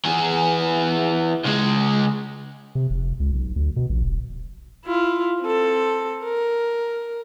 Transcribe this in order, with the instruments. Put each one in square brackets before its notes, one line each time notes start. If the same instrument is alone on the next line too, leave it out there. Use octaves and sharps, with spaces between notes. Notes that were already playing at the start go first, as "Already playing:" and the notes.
[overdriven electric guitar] E3 G#4
C#2 G#3
[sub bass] C3
F1
C#2
B1
D2
B2
A#1
D#1
[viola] E4 F4
C4 A4
A#4